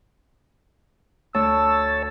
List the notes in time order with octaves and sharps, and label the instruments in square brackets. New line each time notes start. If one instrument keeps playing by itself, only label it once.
[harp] D2 [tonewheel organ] C#5 A5 [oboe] E6